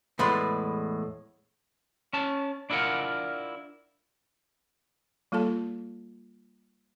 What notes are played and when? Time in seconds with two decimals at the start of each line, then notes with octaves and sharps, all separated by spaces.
0.19 E2 A2 G#3 B4 D5 C6
2.13 C#4 A5
2.70 D4 E4 F4 A#4 F#5
5.32 G3 A#3 F4 A4 A5